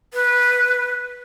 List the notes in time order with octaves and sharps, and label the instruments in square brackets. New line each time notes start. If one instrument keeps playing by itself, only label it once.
[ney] B4